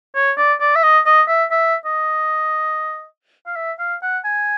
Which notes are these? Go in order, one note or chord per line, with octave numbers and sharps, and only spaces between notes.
C#5
D5
D5
E5
D#5
D#5
E5
E5
D#5
F5
E5
F5
F#5
G#5